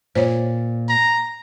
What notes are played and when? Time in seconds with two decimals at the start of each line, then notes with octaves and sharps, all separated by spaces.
0.15 A#2 C5 C#5
0.89 A#5